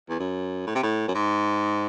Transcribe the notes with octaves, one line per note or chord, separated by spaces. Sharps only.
E2
F#2
A2
C3
A2
F#2
G#2